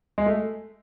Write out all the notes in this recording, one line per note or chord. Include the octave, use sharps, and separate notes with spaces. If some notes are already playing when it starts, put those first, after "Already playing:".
G#3
A3